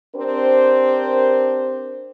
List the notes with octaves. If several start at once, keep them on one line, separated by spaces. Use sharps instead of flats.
C4 D4 G4 A#4 C5